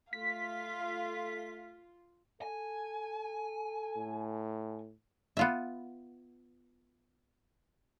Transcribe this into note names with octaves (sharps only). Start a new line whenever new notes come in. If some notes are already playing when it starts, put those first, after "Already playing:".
A3 F4 F5 B6
A4 G#5
A2
B3 F4 E5